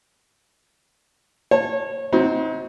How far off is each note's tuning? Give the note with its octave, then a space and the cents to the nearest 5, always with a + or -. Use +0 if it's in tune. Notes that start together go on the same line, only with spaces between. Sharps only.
C#5 -25 A5 +0
F#3 +0 C4 +0 D#4 +35